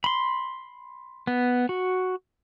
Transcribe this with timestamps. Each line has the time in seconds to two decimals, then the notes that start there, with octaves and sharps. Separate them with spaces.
0.04 B5 C6
1.27 B3
1.69 F#4